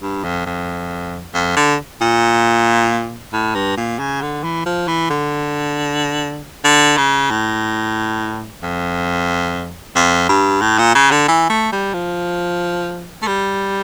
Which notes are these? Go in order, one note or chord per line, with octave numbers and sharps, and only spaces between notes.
G2
F2
F2
F2
D3
A#2
A2
G2
A#2
C#3
D3
E3
F3
E3
D3
D3
C#3
A2
F2
F2
G2
A2
A#2
C#3
D3
E3
A3
G3
F3
A3
G3